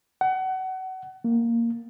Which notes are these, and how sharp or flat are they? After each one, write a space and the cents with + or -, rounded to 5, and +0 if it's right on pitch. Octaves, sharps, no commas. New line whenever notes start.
F#5 +30
A#3 -5